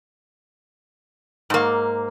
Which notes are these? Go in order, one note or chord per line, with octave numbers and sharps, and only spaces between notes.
G#2 A#3